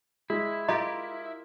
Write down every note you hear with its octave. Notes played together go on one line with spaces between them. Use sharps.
G#3 E4
F4 G4 A#4 D#5 A#5